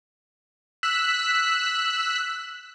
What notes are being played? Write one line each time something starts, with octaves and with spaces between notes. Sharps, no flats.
E6 F#6 B6